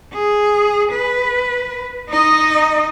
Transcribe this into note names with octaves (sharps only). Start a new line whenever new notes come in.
G#4
B4
D#4 D#5